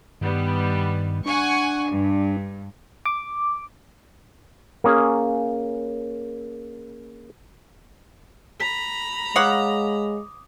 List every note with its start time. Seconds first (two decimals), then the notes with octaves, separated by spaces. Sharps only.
0.21 G2 D#3 G3 B3
1.26 D4 F#5 G#5 C#6
1.89 G2
3.06 D6
4.84 A#3 C#4 G#4
8.60 A#5 B5 B6
9.36 G#3 C#5 F5 F#5 D6 D#6